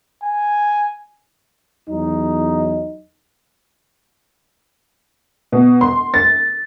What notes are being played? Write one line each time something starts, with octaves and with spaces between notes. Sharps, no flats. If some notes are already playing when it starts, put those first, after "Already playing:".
G#5
E2 F#3 D#4
B2
C6
A6